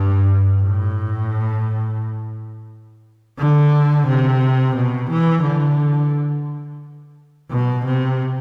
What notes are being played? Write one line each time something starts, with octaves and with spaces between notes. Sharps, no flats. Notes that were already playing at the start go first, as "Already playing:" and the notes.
Already playing: G2
A2
D3
C3
B2
E3
D3
B2
C3